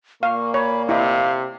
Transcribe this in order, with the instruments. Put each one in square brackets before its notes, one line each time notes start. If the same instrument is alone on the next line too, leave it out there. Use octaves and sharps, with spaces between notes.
[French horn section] A#2 A#3 [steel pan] F5 [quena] C#6
[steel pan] C#5 [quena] B5
[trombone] C3 [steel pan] E4 D#5 [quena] F5